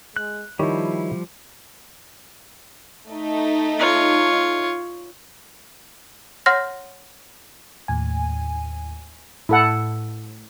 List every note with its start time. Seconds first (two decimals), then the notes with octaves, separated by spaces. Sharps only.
0.16 G#3 F#6
0.59 D#3 F3 G3 E4 G4 C#5
3.08 A3 D#4
3.79 F4 C#5
6.46 C#5 F#5 C6 F6 A#6
7.88 D#2 A2 G#5
9.49 A2 E4 A4 F#5